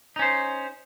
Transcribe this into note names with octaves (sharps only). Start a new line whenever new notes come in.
C#4 D#4 C5